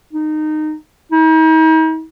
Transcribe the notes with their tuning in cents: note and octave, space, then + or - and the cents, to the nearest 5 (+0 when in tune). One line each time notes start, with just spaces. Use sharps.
D#4 -20
D#4 +40